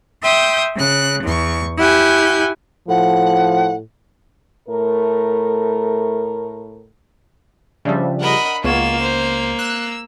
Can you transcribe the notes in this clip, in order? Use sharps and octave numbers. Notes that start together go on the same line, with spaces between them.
E5 G5 C6 D#6 G6
C#3 F#6
E2 C#6
E4 G4 F#5 G#5 G6
A2 F3 F#5
A2 A3 A#4
C#3 F3 G3 D4 E5
A#4 D#5 F#5 B5
C#2 G#3 A#3 B3 F4 C#5 E7
C5
E6 F#6